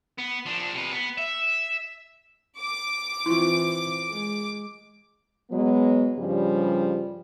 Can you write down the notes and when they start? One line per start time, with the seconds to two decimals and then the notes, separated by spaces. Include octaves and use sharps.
0.18 B3
0.46 F3 D4
0.74 C3 B4
0.92 B3
1.18 E5
2.59 D6
3.26 E3 C4 E4 F4
4.10 G#3
5.51 B2 F#3 G#3 B3
6.17 G2 C#3 F3 G3